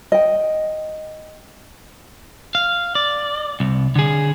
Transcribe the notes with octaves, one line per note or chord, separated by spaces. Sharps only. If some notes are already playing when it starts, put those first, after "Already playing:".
D#5 G5
F5
D5
C2
D3 G#4